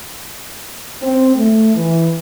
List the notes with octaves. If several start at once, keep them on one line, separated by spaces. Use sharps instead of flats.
C4
A3
E3